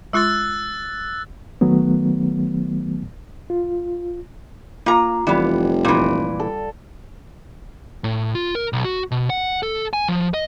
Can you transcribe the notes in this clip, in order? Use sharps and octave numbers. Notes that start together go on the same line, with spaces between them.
G#3 F4 C6 E6 F#6 A6
D#3 F#3 A3 B3
F4
A#3 F4 A#5
F1 E3 G3 B3
A#2 E3
A4
A2
F4
A#4
B1
F#4
B2
F#5
A4
G#5
F3
D#5